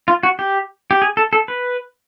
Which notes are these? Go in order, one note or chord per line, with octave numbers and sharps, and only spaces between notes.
F4
F#4
G4
G4
G#4
A4
A4
B4